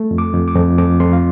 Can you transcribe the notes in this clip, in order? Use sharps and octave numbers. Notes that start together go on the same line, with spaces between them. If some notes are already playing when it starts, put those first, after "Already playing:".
Already playing: A3
F2
D6
F2
D6
F2
F2 D6
F2 C6
F5